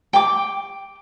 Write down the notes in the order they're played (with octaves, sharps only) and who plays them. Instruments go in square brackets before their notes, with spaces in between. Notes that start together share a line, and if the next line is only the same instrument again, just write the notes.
[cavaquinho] G5 D6